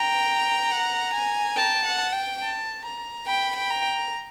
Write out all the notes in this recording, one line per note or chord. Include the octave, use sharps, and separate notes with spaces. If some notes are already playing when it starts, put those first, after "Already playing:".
Already playing: G5 A#5
F#5
G#5
G5 A5
F#5
G5
A5
A#5
G5 B5
G5
A#5